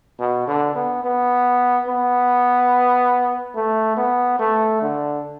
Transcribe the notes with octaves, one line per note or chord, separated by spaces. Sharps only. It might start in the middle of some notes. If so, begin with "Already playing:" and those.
B2
D3
B3
B3
B3
A3
B3
A3
D3